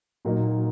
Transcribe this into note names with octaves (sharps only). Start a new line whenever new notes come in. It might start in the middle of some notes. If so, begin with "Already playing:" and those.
A#2 F#3 A#3 D#4